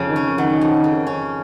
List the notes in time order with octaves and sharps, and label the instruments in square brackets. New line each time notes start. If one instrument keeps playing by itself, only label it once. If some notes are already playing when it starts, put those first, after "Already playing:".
Already playing: [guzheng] F2 C#3
[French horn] D#3
[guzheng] C#4
[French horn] D#3 [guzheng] F#3
[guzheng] F2
C#3
C#4